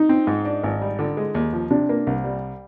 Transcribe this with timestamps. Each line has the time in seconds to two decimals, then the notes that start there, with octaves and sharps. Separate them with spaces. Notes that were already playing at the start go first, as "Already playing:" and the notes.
Already playing: D#4
0.09 C4
0.27 G#2
0.45 D4
0.63 G#1
0.81 G3
0.99 D3
1.17 G#3
1.35 D#2
1.53 F3
1.70 C3 D4
1.89 A#3
2.07 C2
2.24 G3